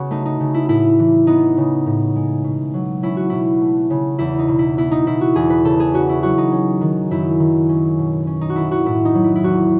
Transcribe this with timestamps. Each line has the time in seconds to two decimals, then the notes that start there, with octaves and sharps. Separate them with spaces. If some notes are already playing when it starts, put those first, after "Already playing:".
Already playing: C#3 B3 F#4
0.11 A3 D#4
0.25 D#4
0.40 C#3
0.54 E4
0.69 A2 E4
0.99 E3
1.27 B3 D#4
1.57 C#3
1.86 A2
2.16 G#3
2.44 B2
2.74 F#3
3.03 C#4 E4
3.17 F#4
3.30 B2 E4
3.61 A3
3.90 C#3
4.19 E2 E4
4.39 D#4
4.48 B2
4.59 E4
4.77 B3 E4
4.91 D#4
5.07 B2 E4
5.21 F#4
5.36 E2 G#4
5.50 B4
5.64 C#3 A4
5.80 G#4
5.94 C#4 F#4
6.09 E4
6.23 F#3 F#4
6.38 D#4
6.52 C#4
6.81 D#3
7.11 F#2 E4
7.40 D#3
7.69 C#4
7.99 B2
8.27 C#4
8.41 D#4
8.50 F#4
8.56 D#3 E4
8.71 F#4
8.86 A2 E4
9.05 D#4
9.15 F#3
9.24 E4
9.35 E4
9.44 E2 F#4